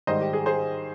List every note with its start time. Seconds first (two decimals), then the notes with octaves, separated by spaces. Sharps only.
0.07 G#2 D#3 G3 C5 D#5
0.21 G4
0.33 G#4
0.46 G#4 C5